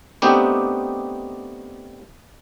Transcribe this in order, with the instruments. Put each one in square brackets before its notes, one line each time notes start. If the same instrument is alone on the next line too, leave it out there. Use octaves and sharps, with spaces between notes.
[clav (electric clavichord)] A3 B3 C4 D4 D#4 G4